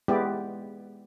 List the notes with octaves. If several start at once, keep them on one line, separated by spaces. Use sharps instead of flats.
G#3 B3 E4 G4 D5